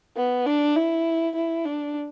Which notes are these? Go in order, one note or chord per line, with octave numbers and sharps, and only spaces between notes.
B3
D4
E4
E4
D4